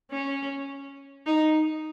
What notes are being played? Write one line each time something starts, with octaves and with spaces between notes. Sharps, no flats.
C#4
D#4